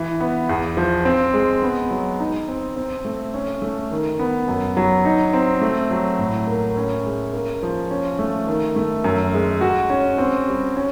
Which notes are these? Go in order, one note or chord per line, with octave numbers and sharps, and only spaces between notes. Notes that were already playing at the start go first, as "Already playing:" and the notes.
Already playing: E3
B3
E2
F3
C4
G#3
B3
F#3
D#4
C4
C4
A3
C#4
A3
D#3
B3
F#2
F#3
D#4
C4
A3
F#3
A2
A#3
C#4
G#3
A#3
F3
C#4
A3
D#3
A3
F#2
G#3
F#4
C#4
C4
G3
C#4